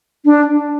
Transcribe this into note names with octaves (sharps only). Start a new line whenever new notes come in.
D4